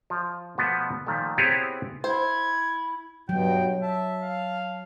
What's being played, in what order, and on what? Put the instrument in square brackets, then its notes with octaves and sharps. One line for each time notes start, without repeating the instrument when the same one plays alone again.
[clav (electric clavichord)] F3
B2 F3 A3 B3
A#2 D#3 F3 A3
B3 C4 E4 G4 G#4 C#5
[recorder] E4 [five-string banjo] C5 [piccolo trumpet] G#6
[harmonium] G2 B2 [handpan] F#3 [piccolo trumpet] G5
[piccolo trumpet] E5 [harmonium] A5
[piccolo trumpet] F5